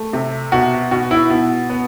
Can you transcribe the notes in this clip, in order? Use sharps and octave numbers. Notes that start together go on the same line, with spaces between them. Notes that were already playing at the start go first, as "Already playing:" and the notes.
Already playing: A3
C3
B2 F#4
B2 F#4
E4
B2
B3